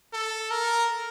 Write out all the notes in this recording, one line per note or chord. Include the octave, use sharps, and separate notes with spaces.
A4
A#4